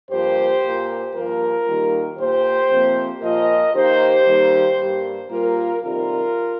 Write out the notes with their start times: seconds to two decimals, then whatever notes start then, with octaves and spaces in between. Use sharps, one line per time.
0.10 G2 F3 A#3 G4 C5
0.62 A#2 A#3
1.14 G2 F3 A#3 F4 A#4
1.66 D#2 D#3 G3 A#3
2.18 A#2 A#3 G4 C5
2.70 F2 C3 F3 A#3
3.21 A#2 F3 A#3 A#4 D#5
3.74 D#2 D#3 A#3 G4 C5
4.26 D#2 D#3 G3 A#3
4.78 G2 G3 A#3
5.30 A#2 G3 A#3 F4 A#4
5.82 F2 C3 D#3 G3 F4 A#4